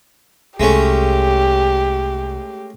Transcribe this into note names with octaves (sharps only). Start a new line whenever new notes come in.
C2 G#3 A3 C#4 G4